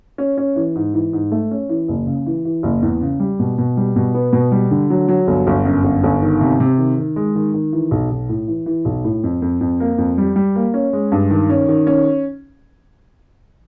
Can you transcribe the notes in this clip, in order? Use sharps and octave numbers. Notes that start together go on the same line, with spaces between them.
C#4
C#4
E3
G#2
E3
G#2
A3
C#4
E3
F#1
C#3
E3
E3
F#1
E2
C#3
G3
B2
B2
G3
B2
B3
B2
G3
D3
F#3
F#3
G1
G1
F#2
G1
G1
D#3
C3
C3
D#3
D#3
G#3
D#3
D#3
E3
B1
B1
A2
E3
E3
B1
A2
F2
F2
F2
A#3
F2
G3
G3
A#3
C#4
G#3
G2
D#3
C#4
D#3
C#4